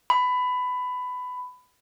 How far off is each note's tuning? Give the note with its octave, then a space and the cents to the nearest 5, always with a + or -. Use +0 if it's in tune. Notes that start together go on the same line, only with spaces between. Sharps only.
B5 +15